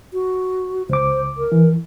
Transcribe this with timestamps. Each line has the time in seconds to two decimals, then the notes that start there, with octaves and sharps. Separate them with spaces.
0.13 F#4
0.89 C#2 C5 D6
1.37 A#4
1.52 E3